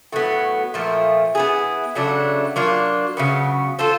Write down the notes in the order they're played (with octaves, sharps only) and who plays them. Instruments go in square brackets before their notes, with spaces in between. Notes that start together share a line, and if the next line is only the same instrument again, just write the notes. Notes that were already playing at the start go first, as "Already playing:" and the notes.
[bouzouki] A2 F#3 B3
A#2 F3 A3
B3 E4 G#4
C#3 F#3 A3 D4
F#3 A#3 D4 F4
C#3 F#3 B3
C4 F4 A4 C5